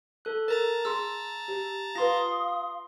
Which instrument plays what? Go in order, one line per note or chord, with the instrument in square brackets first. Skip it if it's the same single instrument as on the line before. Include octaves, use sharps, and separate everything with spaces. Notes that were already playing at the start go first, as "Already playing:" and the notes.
[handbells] A4 F#6
[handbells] A#4 [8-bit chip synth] A5 A#5 A6
[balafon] G#4 C6 [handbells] E6
[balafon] G4
[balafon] F4 B4 [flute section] F5 D#6 [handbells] C6 A#6